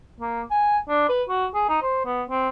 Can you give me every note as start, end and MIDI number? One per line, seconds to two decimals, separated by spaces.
0.20 0.42 58
0.51 0.78 80
0.89 1.04 62
1.09 1.23 71
1.29 1.46 66
1.54 1.66 68
1.69 1.77 63
1.82 2.03 72
2.05 2.23 59
2.29 2.49 60